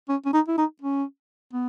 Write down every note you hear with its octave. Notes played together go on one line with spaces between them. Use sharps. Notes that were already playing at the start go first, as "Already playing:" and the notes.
C#4
C#4
D#4
E4
D#4
C#4
B3